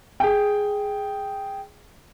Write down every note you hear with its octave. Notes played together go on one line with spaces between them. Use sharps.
G#4 G5